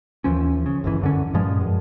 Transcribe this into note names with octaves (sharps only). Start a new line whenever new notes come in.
D#2 E3 F3 C#4
C#3
G1 C#2 E3
F#2 D3 C#4
G2 A#2 F3 G#3
F#2